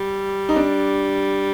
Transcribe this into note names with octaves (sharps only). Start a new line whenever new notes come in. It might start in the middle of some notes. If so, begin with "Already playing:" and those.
Already playing: G3
D#4
D4